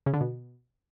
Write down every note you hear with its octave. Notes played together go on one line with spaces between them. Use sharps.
C#3
D3
B2